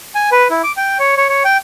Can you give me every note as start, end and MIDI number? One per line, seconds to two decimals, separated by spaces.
0.15 0.30 80
0.32 0.48 71
0.50 0.62 64
0.64 0.72 86
0.77 0.98 79
0.99 1.15 73
1.17 1.28 73
1.29 1.43 73
1.45 1.57 79